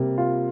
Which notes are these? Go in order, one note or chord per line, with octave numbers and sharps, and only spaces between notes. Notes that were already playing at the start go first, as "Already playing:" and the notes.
Already playing: C3 G3 A#3
F4